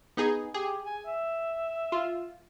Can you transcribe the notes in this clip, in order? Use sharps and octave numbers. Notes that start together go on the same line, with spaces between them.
B3 D#4 G#4
G4 G#4
G#5
E5
F4